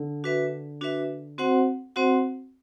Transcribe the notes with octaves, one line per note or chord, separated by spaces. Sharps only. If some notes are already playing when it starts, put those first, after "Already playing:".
Already playing: D3
D4 F#4 B4 E5
D4 F#4 B4 E5
C4 F#4 C5 F#5
C4 F#4 C5 F#5